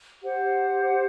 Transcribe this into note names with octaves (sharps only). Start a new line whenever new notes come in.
G4 C5 F#5